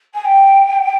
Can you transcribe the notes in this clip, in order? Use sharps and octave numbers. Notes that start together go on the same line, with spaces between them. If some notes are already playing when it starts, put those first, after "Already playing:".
G#5
G5